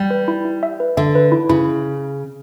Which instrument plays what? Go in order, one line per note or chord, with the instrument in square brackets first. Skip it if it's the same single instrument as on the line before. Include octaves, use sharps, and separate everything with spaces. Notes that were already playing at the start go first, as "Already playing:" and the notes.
Already playing: [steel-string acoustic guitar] G3
[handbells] B4
E4
E4
E5
B4
[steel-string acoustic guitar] D3 [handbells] E5
[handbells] B4
E4
[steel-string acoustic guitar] C#3 [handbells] E4